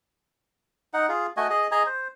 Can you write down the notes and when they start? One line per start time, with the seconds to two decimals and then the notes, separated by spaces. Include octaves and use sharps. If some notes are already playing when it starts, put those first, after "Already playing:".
0.94 D#4 F#5
1.09 F4 G#4
1.37 A3 F#4 D#5 G#5
1.50 G#4 D#5
1.72 G#4 D#5 G#5 A#5
1.86 C5